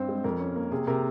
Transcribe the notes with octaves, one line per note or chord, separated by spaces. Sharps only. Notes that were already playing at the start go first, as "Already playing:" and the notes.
Already playing: G2 C4 C5
G#3
F2 A#4
C#4
A#3
C3 G#4
C3 A#4